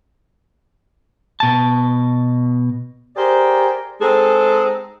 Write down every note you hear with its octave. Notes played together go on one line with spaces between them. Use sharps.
B2 A5
G4 G#4 A#4 C5 D5
G#3 C4 D#4 G#4 A4